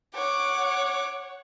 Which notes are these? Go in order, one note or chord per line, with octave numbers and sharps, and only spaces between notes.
C#5 F#5 D6